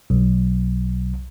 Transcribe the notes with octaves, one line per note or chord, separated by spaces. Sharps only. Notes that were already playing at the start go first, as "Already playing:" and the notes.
B1